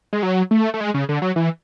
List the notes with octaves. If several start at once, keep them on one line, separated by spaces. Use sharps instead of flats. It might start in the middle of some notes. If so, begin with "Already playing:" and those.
G#3
F#3
A3
A3
G#3
C#3
D3
F#3
E3